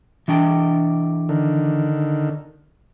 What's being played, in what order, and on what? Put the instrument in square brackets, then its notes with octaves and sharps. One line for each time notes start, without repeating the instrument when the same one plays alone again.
[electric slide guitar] E3 D4 G5
[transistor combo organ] D3 D#3